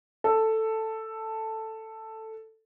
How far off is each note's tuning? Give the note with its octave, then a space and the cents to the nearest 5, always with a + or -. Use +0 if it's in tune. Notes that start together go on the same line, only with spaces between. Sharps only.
A4 +5